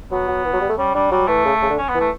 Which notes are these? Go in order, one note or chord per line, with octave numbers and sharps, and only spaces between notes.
F#3 B3
F#3
E3
F#3
G3
A3
G3 C#4
G3 D4
F#3 G3
E3 A3
C#3
C#3
D3
C#4
B3
E3
A3